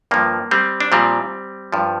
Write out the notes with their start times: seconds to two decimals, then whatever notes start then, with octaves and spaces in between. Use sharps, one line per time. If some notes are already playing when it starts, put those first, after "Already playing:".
0.11 G2 F3 A#3
0.51 G3 C4
0.80 D4
0.92 A#2 F3 G3 C4
1.72 G2 F3